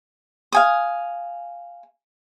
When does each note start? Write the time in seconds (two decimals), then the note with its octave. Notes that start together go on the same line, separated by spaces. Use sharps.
0.52 F5 G#5 D#6